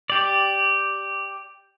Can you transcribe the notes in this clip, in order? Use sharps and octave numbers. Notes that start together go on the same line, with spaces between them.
G4 D5